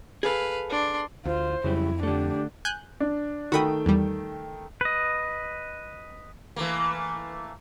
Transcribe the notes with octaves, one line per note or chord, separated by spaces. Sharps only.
G#4 A4 B4 F5
D4 C6
D2 F4 C5
F2 C#3 F#3 G3 E4
D3 A3 D4 G4
G#5 F#6 G6
D4
D#3 A3 F#4 G5 B5 D#6
E2 G3
B4 D#5
E3 A3 A#3